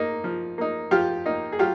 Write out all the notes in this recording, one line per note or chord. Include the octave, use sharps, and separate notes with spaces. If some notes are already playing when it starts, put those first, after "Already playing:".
Already playing: A#3 D#4
F3
A#3 D#4
F3 F4 G4
A#3 D#4
G#4
F#3 F4 G4